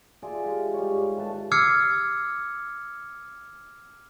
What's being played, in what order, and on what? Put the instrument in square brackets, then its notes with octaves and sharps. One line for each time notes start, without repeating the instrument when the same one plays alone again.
[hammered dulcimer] E4 F4 G#4 D5
G#3 G4 F5
G3 C#5
G#2
D#3 A3 B4 A5
[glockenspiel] D6 E6 F6 G#6 C7 C#7